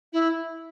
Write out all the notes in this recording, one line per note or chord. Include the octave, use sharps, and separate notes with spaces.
E4